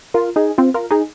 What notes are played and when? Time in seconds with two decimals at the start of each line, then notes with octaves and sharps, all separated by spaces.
0.14 F4 A#4
0.36 D#4 G#4
0.58 C4 F4
0.74 F4 A#4
0.91 D#4 G#4